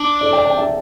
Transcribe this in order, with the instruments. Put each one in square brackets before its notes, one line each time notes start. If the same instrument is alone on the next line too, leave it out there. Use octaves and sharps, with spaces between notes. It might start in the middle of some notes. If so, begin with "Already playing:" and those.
Already playing: [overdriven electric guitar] D4
[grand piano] A4 D5
D5 G5
D5 G5
E5 A5